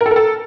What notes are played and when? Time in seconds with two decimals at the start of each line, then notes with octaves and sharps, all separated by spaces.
0.01 A#4
0.06 A4
0.11 A#4
0.16 A4